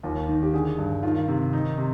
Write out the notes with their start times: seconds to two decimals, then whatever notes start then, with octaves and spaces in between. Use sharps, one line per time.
0.03 D#2 F4
0.28 D#3
0.43 G4
0.53 D3 G#4
0.78 G2
1.03 D#3 F4
1.28 C3
1.53 D#3 D#4
1.78 C3